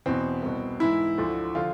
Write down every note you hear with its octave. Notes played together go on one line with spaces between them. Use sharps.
E2 B2 C4
C2 B2
G#2 E3 E4
D2 D3 F3
D3 F3 F4